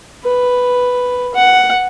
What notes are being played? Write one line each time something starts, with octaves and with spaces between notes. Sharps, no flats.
B4
F#5